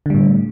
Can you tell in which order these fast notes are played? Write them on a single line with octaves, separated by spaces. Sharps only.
D3 G3 A2